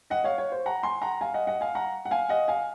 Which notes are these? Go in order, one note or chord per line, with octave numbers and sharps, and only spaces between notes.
D#5 F#5
C#5 F5
C#5
C5
F#5 A#5
G#5 C6
F#5 A#5
F5 G#5
D#5 F#5
D#5 F#5
F5 G#5
F#5 A#5
F#5
F5 G#5
D#5 F#5
F5 G#5